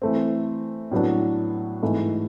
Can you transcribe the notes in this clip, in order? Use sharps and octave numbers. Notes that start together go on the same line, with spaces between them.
E3 A3 C4
A2 F#3 B3 D4
G#2 E3 A3